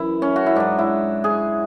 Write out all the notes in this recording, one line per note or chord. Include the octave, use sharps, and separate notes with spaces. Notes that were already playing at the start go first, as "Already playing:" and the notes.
Already playing: F#2 E3 E4
C#4
F#4
E4
G#2 F#3 D4
E4
G#4